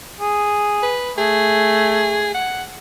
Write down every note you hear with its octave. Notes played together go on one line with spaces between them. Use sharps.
G#4
B4
A3 G#4
F#5